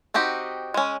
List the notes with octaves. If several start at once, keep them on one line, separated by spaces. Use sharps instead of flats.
C4 D#4 F#4 G4
G#3 C#4